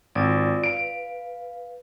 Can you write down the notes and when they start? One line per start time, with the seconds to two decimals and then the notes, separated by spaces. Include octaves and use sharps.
0.15 G#1 F4 D5
0.64 B4 F5 D7